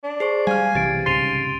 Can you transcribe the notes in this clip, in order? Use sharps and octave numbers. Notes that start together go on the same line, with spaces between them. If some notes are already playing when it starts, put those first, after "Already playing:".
D4
G#4 C5 C#6 C7
G3 F5 G#5 F6
B1 C3 E3 G4 A6 D7
C2 G#2 C#3 C6 A6 D#7 F7